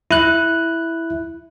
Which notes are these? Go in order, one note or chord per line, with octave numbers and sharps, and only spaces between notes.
E4 F#6